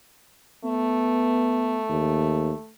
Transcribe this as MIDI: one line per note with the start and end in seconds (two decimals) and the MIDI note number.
0.65 2.72 57
0.65 1.81 59
1.89 2.52 39